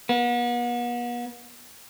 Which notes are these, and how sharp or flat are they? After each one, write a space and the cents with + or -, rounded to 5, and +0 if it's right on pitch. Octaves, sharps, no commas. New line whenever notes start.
B3 -40